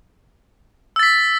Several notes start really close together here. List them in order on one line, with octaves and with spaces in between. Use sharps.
E6 A6 B6